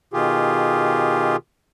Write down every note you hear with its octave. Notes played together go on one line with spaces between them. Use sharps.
B2 D#3 F4 G4 G#4